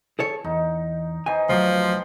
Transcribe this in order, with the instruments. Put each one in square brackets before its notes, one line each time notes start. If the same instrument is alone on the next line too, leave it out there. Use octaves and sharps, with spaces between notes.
[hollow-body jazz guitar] G#4 A4 C#5
[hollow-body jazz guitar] E2 [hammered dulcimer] D#4
[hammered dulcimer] E3 D#4 C5 [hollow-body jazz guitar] G#5
[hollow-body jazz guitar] D2 F#3 [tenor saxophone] F3 [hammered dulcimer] G4 C6